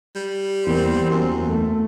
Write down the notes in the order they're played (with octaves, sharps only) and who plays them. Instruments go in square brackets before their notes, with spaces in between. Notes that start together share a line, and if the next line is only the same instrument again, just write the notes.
[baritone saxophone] G3
[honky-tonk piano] E2 A#3 [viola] C4
[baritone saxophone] F#2
[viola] A3